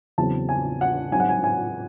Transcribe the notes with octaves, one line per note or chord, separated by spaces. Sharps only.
E2 C#3 F#3 C4 A5
G#5
F#5
G#2 F#3 C4 D#4 G#5
F#5
G#5
G#5